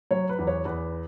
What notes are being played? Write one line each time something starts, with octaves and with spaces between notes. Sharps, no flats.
F#3 C#5
B4
E2
C#5
E2 B4